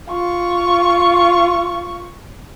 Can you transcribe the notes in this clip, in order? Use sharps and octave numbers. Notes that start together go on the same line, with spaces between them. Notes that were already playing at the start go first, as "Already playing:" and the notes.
F4 C#6